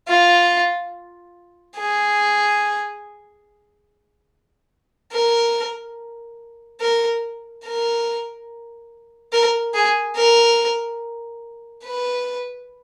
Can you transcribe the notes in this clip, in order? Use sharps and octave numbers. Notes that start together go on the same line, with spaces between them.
F4
G#4
A#4
A#4
A#4
A#4
G#4
A#4
B4